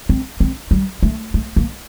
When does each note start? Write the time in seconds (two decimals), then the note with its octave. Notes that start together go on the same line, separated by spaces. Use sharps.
0.09 C4
0.40 C4
0.71 G3
1.03 A3
1.34 A3
1.56 A#3